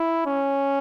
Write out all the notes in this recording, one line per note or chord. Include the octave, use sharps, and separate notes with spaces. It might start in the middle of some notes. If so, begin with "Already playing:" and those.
Already playing: E4
C#4